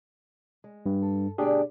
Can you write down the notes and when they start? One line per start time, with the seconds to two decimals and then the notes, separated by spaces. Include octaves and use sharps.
0.64 G#3
0.86 G2
1.02 A4
1.38 D2 B2 D4 G4 G#4 D5